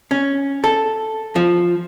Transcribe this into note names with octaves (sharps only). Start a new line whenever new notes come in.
C#4
A4
F3